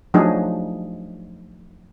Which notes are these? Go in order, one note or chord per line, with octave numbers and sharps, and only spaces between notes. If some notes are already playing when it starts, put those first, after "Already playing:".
F3 F#3 A3 D4 D#4 G#4